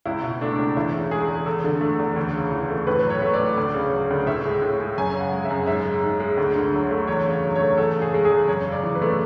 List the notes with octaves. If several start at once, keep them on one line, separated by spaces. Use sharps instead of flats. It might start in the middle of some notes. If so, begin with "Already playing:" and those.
C#2 E4
B2
A3 D4
C#2
E2 E4
C#3
G#3 G#4
E2
E2 A4
D3
A3
E2
D2
C#3
E3
A3
A2 B4
F#3
C#5
A3
D5
A2
D2
C#3
F#3
D2
A2 E5
G#3
A2
G#3
F#2 G#5
C#3
F#5
G#3
E5
F#2
G#2 E5
G#3
G#2
G#3
D2
D3
F#3
A3
E2 C#5
C#3
F#3
C#5
A3
E2 A4
C#3
G#4
G#3
G#4
E2
F#2 C#5
C#3
D5
E3
B4
A3